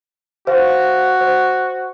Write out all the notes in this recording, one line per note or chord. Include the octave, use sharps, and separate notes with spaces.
F#4 C5 F5
C5